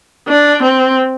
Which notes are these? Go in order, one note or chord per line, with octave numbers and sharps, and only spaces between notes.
D4
C4